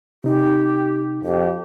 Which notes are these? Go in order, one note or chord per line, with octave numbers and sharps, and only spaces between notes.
C3 D#4 G4
F2 G4